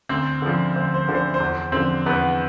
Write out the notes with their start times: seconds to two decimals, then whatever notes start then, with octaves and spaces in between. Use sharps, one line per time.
0.09 D2 C4 C5
0.42 D3 F3
0.76 D2 C5
0.94 C5
1.09 D3 F3
1.15 C5
1.34 C5
1.40 E2
1.53 C5
1.72 D3 F3 C4 C5
2.06 E2 B3 B4